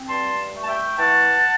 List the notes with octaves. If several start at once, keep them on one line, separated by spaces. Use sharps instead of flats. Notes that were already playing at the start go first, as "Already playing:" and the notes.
Already playing: C4
G2 A5 C6
A3
A5
E5 G5
E3 F#5 A5